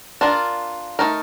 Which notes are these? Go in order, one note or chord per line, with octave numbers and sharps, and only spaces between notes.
D4 F4 A#4
A3 D#4 A#4